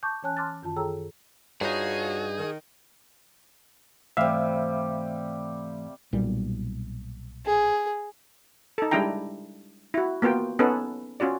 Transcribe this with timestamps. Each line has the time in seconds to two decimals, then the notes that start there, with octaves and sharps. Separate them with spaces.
0.03 A5 C#6 D6 G6
0.23 E3 C#4 C#5 G#5 A5 F#6
0.37 A5 C6 D6 F6 F#6 A6
0.63 F#2 D#3 F4 A5
0.76 G#4 A4 C#5 G5 A#5 E6
1.61 G2 D#4 F4 F#4 G#4 C#5
2.38 D#3
4.17 G#2 C3 E3 G3 A3 E5 F5
6.13 B1 A#2 G3
7.46 G#4
8.78 D#4 A4
8.91 G3 G#3 D4 E4 G5 A#5
9.94 E4 F#4
10.22 A#3 B3 F4 F#4 G5
10.59 B3 C#4 D#4 A4 B4
11.20 C#4 F4 F#4 D5